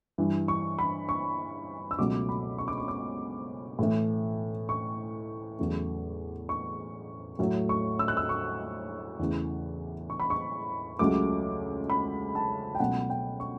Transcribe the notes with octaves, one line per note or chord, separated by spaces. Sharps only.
G2 E3 G3
C#6
B5
C#6
E6
C#2 B2 F#3 A3 D6
B5
C#6
D6
C#6
D6
A2 E3 A3
C#6
E2 C#3 F#3 A3
C#6
A2 F#3 A3
C#6
E6
F#6
E6
C#6
E2 C#3 E3 A3
C#6
B5
C#6
C#2 C#3 F#3 A3 D6
B5
A5
G5
C#2 B2 F#3 A3 F#5
G5
C#6